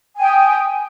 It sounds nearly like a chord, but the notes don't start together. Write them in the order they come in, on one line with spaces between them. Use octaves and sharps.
G#5 G5 D#6